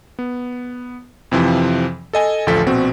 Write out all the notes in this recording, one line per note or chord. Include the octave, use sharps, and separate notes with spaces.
B3
F2 C3 E3 F3
A4 D#5 G#5
A1 D2 F3 A4 B6
A#1 B2 C4 F#4